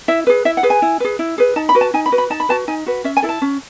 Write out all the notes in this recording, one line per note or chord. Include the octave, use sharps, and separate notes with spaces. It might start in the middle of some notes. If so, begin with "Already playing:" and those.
E4 E5
G#4 B4
E4 E5
F#5
G#4 B4
G#5
E4
G#4 B4
E4
G#4 B4
D#4 A5
B5
F#4 B4
A5
D#4 G#5
B5
F#4 B4
B5
D#4 A5
B5
F#4 B4 A5
D#4 G#5
F#4 B4
C#4 E5
G#5
E4 A4
A5
C#4